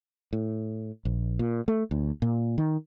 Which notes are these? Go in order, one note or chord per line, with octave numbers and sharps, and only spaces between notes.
A2
A#1
A#2
A3
D2
A#2
D#3